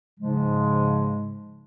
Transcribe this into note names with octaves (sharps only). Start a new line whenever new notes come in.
G#2 C#3 F3 G#3